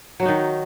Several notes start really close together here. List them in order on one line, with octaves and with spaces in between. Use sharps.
F#3 F#4 D#4 D#3